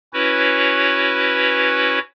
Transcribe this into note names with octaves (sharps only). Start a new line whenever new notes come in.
C#4 E4 F#4 B4 C#5